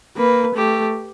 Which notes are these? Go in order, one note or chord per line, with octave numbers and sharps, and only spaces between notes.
A#3 B4
A3 G4